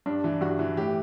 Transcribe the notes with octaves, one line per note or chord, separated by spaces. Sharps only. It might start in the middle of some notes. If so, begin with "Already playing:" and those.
G2 D4
E3
G2 F#4
E3
A2 G4